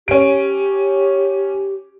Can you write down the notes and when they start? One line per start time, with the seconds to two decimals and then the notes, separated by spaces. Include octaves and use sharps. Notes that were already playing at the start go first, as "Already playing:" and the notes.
0.08 C#4 G4 D7